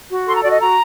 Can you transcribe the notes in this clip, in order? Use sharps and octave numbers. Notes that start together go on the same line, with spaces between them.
F#4
A4 C6
A#5
F#4 D5
D#5
F#4 A#5